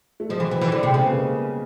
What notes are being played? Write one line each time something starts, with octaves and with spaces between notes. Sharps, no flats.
A3
F3 F#3 G#3
E3
E3
E3
D3
C3 G#3
C#3 G3 A3
B3
G#3 A#3